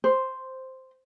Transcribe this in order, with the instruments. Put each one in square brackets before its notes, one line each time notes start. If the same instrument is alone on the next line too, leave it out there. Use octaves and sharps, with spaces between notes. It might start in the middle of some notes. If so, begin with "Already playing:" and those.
[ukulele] C5